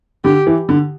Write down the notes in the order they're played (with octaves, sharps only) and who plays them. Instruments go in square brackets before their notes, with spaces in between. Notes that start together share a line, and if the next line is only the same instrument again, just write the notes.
[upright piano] D3 [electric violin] G4
[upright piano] E3
D3